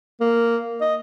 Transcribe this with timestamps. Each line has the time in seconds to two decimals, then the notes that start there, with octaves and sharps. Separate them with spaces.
0.21 A#3
0.81 D#5